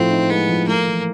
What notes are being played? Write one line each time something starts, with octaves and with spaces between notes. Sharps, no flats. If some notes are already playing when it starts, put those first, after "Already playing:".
Already playing: A2 F3 C4
D#4
G#3 B3
F3
A3 A#3
E3